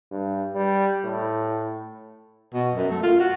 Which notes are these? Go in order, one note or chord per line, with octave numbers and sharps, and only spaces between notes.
G2
G3
A2
B2
F#2
A3
F4
F#4